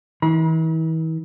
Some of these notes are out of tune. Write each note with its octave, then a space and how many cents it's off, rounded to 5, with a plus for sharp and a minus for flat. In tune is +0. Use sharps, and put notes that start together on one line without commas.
E3 -40 B5 -45